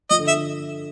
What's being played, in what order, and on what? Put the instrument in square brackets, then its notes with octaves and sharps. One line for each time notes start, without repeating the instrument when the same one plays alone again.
[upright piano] F3 [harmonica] D#5
[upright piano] D3
[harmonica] E5
[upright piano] D3